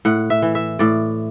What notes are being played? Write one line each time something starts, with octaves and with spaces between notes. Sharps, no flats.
A2 F#5
E5
E3
E5
A2 D5